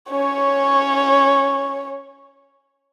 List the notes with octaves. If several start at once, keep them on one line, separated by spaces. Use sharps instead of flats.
C#4 C#5